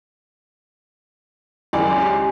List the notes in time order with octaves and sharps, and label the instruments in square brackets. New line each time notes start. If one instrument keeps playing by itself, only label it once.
[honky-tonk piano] C#2 F#2 D5 [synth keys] D#3 E4 [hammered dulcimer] G#3
[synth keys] C#4 G4